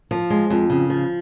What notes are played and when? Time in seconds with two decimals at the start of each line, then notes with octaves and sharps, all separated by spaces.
0.11 F3
0.30 G#3
0.50 F2
0.70 C#3
0.90 F3